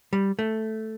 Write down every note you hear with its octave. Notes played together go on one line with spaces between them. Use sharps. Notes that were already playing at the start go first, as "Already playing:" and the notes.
G3
A3